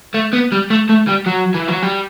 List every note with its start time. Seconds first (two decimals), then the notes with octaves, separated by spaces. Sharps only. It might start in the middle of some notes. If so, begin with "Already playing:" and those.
0.14 A3
0.33 B3
0.52 G3
0.70 A3
0.89 A3
1.07 G3
1.26 F#3
1.55 E3
1.68 F#3
1.83 G3